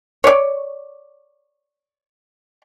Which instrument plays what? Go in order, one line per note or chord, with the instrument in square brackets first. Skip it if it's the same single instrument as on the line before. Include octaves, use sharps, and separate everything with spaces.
[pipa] C#5 D5